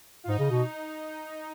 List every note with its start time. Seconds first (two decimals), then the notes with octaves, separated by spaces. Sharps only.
0.24 F4
0.28 G#2 D#4
0.39 C#3
0.50 B2